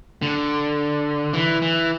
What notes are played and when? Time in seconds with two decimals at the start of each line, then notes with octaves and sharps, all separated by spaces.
0.22 D3
1.34 E3
1.62 E3